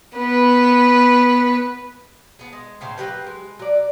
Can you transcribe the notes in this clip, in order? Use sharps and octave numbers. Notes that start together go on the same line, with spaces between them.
B3 B4
B3 G#4
G#3
A2 C#3 C5
F#3 A#3 G4 B4
G#3
F#3 D5